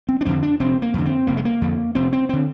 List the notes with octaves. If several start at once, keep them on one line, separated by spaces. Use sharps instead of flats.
C4
D4
F2 D3 C4
D4
F1 C4
A#3
F2 D3
C4
F1 A#3
G#3
A#3
F2 D3
F1 C4
C4
D3 C4